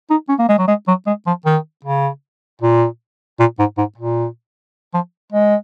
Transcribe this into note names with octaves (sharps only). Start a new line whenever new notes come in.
D#4
C#4
A#3
G#3
F#3
G#3
F#3
G#3
F3
D#3
C#3
A#2
A#2
G#2
G#2
A#2
F3
G#3